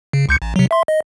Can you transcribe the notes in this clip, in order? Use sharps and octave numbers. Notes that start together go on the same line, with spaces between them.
C#3
C#2 G6 C#7
A1
C3 F#3
E5 C6
D#5